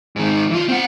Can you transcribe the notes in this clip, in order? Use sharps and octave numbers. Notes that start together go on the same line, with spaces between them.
G#2 D#3
E3 F4
C4 F#5